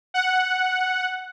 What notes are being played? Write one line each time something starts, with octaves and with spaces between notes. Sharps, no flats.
F#5